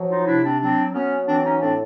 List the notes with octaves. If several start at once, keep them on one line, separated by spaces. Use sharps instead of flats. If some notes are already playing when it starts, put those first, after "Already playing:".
Already playing: F3 F#3
D#4 F4
C3 D4 E4
C4 D4
F#3 C4 D4
F#3 B3 C#4
E3 C4 D4
C#4 D#4
A2 C4 D4